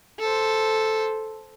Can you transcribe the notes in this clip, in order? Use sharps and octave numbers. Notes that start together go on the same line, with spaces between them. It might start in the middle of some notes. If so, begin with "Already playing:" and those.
A4 C5